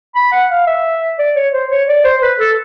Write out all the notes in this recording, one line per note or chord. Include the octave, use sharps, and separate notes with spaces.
B5
F#5
F5
E5
D5
C#5
C5
C#5
D5
C5
B4
A4